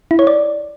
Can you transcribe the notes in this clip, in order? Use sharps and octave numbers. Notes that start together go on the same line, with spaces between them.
E4
C#5
D5